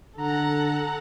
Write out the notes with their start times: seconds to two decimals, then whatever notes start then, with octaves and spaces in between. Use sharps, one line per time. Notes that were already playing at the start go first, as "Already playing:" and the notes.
0.18 D3 A4 F#5 A#5